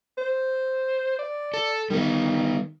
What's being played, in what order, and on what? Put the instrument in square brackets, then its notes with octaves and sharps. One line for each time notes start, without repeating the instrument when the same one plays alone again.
[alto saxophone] C5
D5
[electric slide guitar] A4
[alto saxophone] D#3 [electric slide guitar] G3 B3